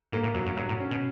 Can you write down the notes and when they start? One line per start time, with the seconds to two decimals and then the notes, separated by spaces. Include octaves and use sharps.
0.12 G#2 A#3
0.23 A2
0.34 F2 F#3
0.46 F#2
0.57 G2 F#3
0.69 A2
0.80 C#4
0.91 B2